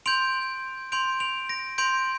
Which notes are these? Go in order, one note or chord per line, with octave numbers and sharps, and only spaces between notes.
C6 G6 D7 F7
C6 G6 D7 F7
D7 F7
A#6 D7
C6 G6 D7 F7